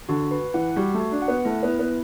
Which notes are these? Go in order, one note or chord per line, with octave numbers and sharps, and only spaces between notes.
D3 F#4
B4
E3 F#5
G3 F#4
A3
F#4
D4
F#5
B3
A3 E4
B3
E4
B3